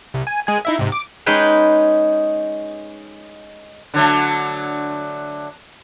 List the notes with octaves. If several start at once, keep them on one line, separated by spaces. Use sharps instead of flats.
C2
G#5
G#3 G#4 G#5
D#4 E4 E5
G#2 C3
D6
G#3 C#4 D#4 G#4 B4 G5
D3 F#3 A3